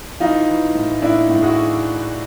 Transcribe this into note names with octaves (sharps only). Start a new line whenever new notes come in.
E3 D#4 F4
E3
A2
A2 D4 E4
A2
F#4 G#4